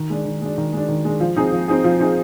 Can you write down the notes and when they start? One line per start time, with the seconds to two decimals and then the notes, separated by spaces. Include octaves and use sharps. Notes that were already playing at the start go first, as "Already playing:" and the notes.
Already playing: D#3
0.10 G#3 D4
0.25 D#3
0.42 G#3 D4
0.58 D#3
0.73 G#3 D4
0.89 D#3
1.05 G#3 D4
1.20 F3
1.37 C4 D#4 G#4
1.52 F3
1.68 C4 D#4 G#4
1.84 F3
2.00 C4 D#4 G#4